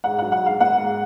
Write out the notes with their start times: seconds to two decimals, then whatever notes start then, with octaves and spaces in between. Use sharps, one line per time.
0.04 G#2 F#5
0.19 F#3 F#5
0.32 F#5
0.42 G#2 F5
0.60 A#3 F#5
0.79 G#2